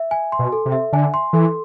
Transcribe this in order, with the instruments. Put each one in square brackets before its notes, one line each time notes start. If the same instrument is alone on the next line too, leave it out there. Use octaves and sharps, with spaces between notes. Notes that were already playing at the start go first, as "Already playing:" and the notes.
Already playing: [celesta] E5
G#5
C6
[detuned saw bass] B2
[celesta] A4
[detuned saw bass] C3
[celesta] E5
[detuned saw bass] D3 [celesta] G#5
[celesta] C6
[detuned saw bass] E3 [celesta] A4